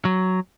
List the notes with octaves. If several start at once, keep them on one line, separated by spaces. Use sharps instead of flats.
F#3